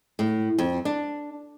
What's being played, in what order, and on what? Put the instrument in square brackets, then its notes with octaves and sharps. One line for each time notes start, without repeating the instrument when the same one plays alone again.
[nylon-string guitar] A2
F2
D4